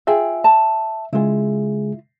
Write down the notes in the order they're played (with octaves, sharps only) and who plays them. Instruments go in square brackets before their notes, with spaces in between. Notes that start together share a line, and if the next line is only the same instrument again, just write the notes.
[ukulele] F4 G#4 G5 [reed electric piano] E5
[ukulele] A5
[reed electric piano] C#3 G#3 G#4 [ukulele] E4 F4